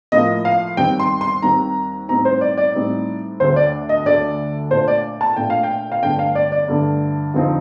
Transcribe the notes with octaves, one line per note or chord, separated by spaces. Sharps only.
A2 F3 A#3 D#5
F5
D#2 D#3 G3 C4 G5
C6
C6
D#2 D#3 G3 C4 A#5
A2 G3 C4 D#4 A#5
C5
D5
D5
A2 G3 C4 D#4
D2 D3 A3 C5
D5
D#5
D2 D3 A3 D5
A#2 A3 D4 C5
D5
A5
A#2 A3 D4 G5
F5
G5
F5
G2 D3 A3 D4 G5
F5
D5
D5
G2 D3 A3 D4
F2 D3 F3 C4 D#4